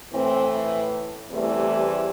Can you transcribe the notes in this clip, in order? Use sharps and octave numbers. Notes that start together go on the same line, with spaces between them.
A2 E3 A3 C4
E2 C3 E3 G3 A3